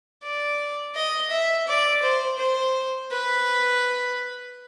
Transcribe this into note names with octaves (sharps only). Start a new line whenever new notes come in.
D5
D#5
E5
D5
C5
C5
B4